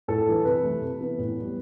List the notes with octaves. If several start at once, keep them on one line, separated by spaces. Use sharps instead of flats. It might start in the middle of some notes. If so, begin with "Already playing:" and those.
A2 A4
E3 A3
C3 B4
E3 A3
C3
E3 B3
A2
G3 B3